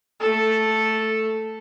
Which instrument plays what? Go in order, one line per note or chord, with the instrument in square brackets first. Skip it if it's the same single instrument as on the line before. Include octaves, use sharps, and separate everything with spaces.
[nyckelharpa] A3 A4